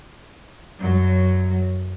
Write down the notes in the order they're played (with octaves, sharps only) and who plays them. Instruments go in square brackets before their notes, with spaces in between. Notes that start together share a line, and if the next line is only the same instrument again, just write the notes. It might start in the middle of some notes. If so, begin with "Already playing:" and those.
[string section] F#2 F#3